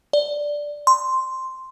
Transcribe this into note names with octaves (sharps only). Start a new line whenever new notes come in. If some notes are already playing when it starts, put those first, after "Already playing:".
D5
C6